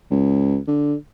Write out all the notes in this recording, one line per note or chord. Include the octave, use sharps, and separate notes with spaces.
C#2
D3